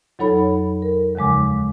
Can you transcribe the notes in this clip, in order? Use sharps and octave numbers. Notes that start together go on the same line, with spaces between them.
F2 F#3 D#4 A4 C#5 B5
A#4
D#2 C#3 F3 G#3 D6